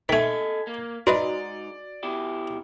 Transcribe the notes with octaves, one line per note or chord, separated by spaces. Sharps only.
D#3 A3 A4 D#5 G#5 G#6 B6
A#3
G#2 D#4 F#4 A#4 B4 D5 D#5
B2 E4 G4